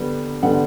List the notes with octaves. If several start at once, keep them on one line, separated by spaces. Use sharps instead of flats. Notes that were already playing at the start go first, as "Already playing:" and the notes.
Already playing: D3 G3 B3 D4
D3 G3 B3 D4 F#5